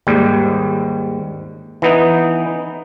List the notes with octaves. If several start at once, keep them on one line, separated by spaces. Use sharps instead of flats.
D#2 G#2 G3
E3 B3 D#4